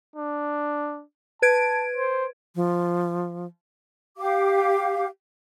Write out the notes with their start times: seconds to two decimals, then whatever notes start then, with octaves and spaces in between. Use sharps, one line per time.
0.16 D4
1.42 B4 A5 G#6 D7
1.94 C5
2.56 F3
4.18 G4 F5 D6